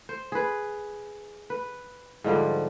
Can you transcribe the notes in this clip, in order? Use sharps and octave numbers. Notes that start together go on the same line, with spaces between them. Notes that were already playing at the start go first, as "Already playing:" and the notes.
C5
G#4 B4
B4
G#2 D3 F3 G3